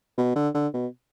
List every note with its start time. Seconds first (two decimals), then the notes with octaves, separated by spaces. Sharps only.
0.18 B2
0.36 D3
0.54 D3
0.74 B2